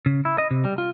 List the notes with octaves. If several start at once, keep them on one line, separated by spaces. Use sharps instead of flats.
C#3
E4
D#5
C3
G3
F4